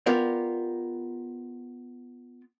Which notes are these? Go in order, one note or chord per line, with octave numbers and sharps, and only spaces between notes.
B3 F4 G4 A#4 D5